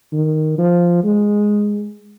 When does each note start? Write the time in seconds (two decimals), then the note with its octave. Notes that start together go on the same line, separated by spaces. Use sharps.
0.12 D#3
0.58 F3
1.03 G#3